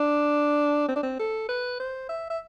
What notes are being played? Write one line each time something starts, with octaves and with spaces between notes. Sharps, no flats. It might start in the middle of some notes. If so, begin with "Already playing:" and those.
Already playing: D4
C4
D4
C4
A4
B4
C5
E5
E5